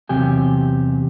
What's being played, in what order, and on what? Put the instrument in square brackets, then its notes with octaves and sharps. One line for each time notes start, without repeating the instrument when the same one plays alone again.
[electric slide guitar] E2 C3 F#3 G4 G#5